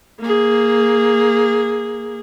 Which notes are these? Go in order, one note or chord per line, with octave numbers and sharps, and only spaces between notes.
A#3 G#4